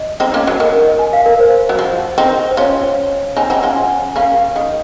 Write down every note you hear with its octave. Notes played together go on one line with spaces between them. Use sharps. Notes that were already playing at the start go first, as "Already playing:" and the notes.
Already playing: D#5
C4 D#4
A#3 C#4
F#3
D#3 A#4
A#4
G#5
F5
A#4
C5
F#3
F3
C4 D#4
C5
C#4 F4 C#5
C4 D#4 G#5
C4 D#4 F#5
C#4 F4 G#5
G#5
A#3 C#4 F5
D#3